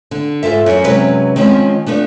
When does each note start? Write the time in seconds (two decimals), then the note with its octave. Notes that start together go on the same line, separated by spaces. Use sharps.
0.11 D3
0.43 G#2 B2 F4 A4 E5
0.66 F#2
0.84 C3 F#3 G#3 C#4 B4
1.36 D#3 F3 G#3 C4 C#4
1.86 F3 A3 B3 D4